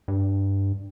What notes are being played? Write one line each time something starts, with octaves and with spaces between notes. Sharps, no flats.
G2